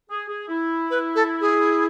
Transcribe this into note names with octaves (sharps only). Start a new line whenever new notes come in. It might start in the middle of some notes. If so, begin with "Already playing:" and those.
G#4
G#4
E4
B4
A4
G#4